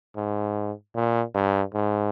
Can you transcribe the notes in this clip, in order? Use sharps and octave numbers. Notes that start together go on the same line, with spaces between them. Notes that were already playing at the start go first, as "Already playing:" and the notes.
G#2
A#2
G2
G#2